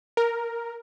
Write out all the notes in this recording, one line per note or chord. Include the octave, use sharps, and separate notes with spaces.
A#4